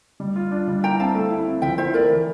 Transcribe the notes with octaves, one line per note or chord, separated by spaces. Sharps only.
G3
F4
D4
G3
E4 G5 A#5
C4 F5 A5
A3
E4
C4
F3 E5 G5
E4 C5 E5
A3 A#4 D5
E3